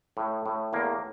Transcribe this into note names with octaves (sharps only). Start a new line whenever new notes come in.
A2
A2
E2 A#3